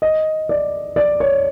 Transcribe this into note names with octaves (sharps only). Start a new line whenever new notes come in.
D#5
D5
D5
C#5